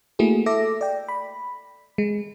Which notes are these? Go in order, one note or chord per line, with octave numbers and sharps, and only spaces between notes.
A3 A#3 E4 F#4 G#4
A4 E5 D6 A#6
D5 G5
B5
G#3